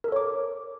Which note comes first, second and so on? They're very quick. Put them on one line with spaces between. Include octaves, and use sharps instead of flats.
A#4 A4 C#5 D6